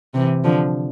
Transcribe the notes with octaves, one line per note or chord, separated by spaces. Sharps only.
C3 E3
D3 F3